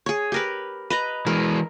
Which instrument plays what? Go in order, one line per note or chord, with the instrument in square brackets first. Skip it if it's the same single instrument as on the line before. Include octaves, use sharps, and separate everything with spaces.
[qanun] G#4 C#5
G4 A#4 B4
B4 D#5 A#5
[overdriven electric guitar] E3 G#3 [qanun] A#4